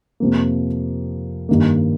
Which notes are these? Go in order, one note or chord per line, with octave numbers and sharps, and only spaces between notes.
F2 C3 F3 A#3
G2 D#3 A#3